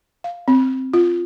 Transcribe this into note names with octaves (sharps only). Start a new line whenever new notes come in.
F5
C4
F4